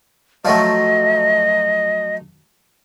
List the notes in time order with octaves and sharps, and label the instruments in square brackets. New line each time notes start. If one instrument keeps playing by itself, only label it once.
[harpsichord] F3 F#3 A3 [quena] D#5